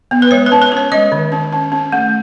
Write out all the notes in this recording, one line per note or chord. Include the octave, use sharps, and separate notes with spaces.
B3
B4
G#3 C#5
B4
C#4
B4
C#4 C#5
G#3 D#5
D#3
C#4
C#4
C#4
A3